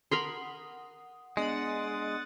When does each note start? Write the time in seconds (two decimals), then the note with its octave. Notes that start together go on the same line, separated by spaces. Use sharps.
0.11 A#4 F#5 B5 C6 D#6
1.37 G#3 B3 D4 D#5 F#5 D#6 A6